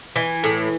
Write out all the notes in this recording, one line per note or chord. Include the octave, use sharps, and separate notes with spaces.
E3
A2